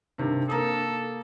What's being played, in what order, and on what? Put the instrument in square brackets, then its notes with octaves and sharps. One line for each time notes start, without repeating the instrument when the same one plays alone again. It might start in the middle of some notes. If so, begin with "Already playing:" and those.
[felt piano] G2 C3 D#3
[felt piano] A#3 A#5 D#6 [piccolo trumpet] A4